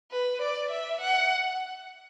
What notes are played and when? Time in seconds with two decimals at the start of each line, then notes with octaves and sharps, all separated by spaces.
0.11 B4
0.42 D5
0.71 E5
1.01 F#5